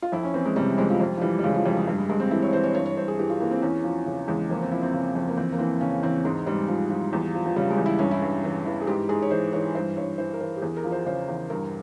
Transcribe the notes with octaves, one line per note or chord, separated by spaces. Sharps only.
F4
F2 E4
C#4
E3 C4
G#3
C3 G3
F2 G#3
F3
F2 G3
F3
E3 G3
G3
C#3 G#3
G3
F3
F2 G3
G#3
G2 G3
G#3
G2 G#3
C4
E3 E4
C#5
E3 C5
C#5
G2 C#5
C#5
G2 C5
G#4
E3 G4
F4
E3 A#3
C4
E2 C#4
F3
C#3
E2 G#3
F2 A#3
C4
F3 E4
C4
C#3
F2
A#3
E2 C4
A#3
E3 C4
C#3 C#4
E2 C4
G#2 G#3
G#2 G3
F3
F3
E2
F3
F3
C#3 G3
G#3
E2
E4
G2 C#4
E4
G2
E3
E3
G#4
G#2 G4
G#2 G#4
C#5
E3 C5
E3 C#5
G2 C5
G2 C#5
E3 C5
A#4
E3 C5
G4
E2 G#4
A#4
F3
C5
C#3 C5
E2
G2 A#4